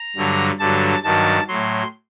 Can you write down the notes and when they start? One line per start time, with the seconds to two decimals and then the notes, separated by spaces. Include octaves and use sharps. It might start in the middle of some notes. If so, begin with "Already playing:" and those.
Already playing: A#5
0.16 G2 D3 F#3
0.59 G2 D3 F#3 A5
1.04 G2 D#3 F#3 A5
1.47 A2 F#3 C6